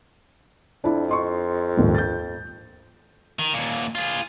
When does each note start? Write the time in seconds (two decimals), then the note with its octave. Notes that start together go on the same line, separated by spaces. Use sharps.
0.84 F2 D4 E4
1.09 D#5 C6 C#6
1.77 A#1 D#2 G#2
1.95 G6 A6
3.39 D#3
3.54 D#2 A#2
3.95 F4 G#4